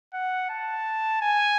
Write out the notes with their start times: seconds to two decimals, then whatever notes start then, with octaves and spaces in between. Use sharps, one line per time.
0.14 F#5
0.50 A5
1.22 G#5